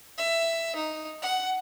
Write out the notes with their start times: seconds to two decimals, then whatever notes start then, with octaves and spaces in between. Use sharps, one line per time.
0.18 E5
0.76 D#4
1.22 F#5